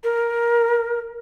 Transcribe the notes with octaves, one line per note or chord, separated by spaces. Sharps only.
A#4